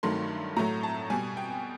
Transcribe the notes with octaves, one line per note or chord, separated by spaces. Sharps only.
G2 D#3 F#3 A3 C6
A2 F#3 A3 A#5
A5
B2 G3 G#5
G5